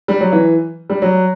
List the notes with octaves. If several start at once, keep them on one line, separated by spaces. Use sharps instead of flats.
G3
F#3
E3
G3
F#3